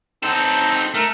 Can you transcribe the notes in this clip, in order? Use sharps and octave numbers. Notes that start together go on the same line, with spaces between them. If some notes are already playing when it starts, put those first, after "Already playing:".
C4 D#4 A4
A3 A#4